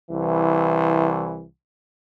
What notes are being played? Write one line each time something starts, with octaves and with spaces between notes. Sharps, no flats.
C2 E3